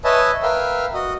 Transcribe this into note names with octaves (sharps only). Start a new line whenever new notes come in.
B4 C#5 D#5 E5 G#5 A5
A#4 B4 E5 F5 G5
F#4 D#5